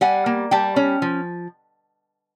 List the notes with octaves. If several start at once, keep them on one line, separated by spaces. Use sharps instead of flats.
G3 F#5 G#5
A#3
G3 G5 A5
C#4
F3